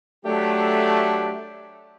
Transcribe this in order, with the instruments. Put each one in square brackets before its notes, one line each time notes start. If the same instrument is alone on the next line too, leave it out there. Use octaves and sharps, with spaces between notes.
[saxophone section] F#3 D4 G4 [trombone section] A3